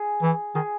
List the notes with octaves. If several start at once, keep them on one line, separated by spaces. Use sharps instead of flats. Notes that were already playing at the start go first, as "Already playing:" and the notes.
Already playing: G#4
E3
D#3 G#4